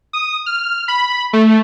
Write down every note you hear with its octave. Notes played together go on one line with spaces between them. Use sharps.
D#6
F6
B5
A3